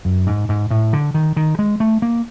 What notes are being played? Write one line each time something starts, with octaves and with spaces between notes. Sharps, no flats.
F#2
G#2
G#2
A2
D3
D#3
D#3
G#3
A3
A#3